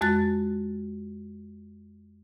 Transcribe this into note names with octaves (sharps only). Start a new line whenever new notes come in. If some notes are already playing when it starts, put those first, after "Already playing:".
F2 G#3 F#4 F#6 A6